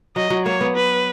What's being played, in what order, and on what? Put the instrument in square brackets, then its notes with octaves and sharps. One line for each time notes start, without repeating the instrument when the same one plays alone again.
[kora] F#3 [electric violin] D#5
[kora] F#3
[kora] A#3 [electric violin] C#5
[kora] B3
[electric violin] B4